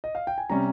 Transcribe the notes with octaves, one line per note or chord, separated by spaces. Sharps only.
D#5
F5
G5
G#5
C3 G3 C#4 A#5